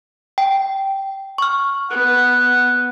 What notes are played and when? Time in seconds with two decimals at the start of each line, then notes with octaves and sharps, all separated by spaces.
0.38 G5
1.38 C#6 F6
1.91 B3 F#5